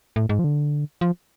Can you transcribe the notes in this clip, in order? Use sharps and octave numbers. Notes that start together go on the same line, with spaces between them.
A2
G#2
F3
D3
F3